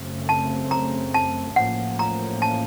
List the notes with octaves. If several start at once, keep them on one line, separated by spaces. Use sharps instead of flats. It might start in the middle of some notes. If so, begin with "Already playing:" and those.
Already playing: F#2 C#3 A3 C4
A5
A#5
A5
A1 A2 F3 A#3 C#4 F#5
A#5
A5